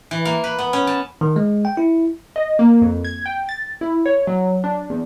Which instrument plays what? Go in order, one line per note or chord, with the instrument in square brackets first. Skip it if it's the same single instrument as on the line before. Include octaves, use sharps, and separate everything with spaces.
[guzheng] E3
A#3
B4
B3
C#4
A5
[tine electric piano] D#3
G#3
G5
E4
[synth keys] D#5
A#3
F2
G#6
G5
A6
E4
C#5
F#3
D4
E2